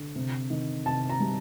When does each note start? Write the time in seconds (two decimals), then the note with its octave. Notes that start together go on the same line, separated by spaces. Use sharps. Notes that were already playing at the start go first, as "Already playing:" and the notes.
Already playing: D3
0.15 C3
0.50 D#3
0.86 C3 A5
1.09 A#5
1.20 G3